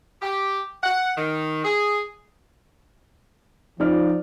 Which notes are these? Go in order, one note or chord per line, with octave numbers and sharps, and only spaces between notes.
G4
F#5
D#3
G#4
F3 D#4 D5 F6